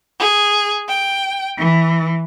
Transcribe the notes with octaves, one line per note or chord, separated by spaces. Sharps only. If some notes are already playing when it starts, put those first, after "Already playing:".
G#4
G5
E3